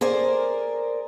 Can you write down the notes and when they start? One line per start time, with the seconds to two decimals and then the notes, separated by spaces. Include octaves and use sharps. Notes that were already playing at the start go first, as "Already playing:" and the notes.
0.01 G#4 A#4 C5 D5